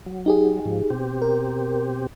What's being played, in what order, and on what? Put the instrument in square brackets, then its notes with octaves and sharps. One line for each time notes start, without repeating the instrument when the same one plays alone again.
[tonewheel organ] F#3
[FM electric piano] D#4 G4 G#4
[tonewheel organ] G#2 F3
B2 C4 G4
[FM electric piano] A#4